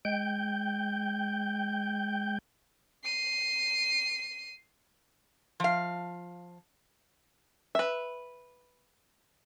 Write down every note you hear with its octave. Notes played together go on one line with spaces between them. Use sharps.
G#3 G5 G6
C7 D#7
F3 F5
B4 E5